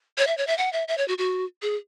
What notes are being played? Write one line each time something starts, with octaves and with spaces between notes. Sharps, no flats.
C#5
E5
C#5
E5
F#5
E5
E5
C#5
F#4
F#4
G#4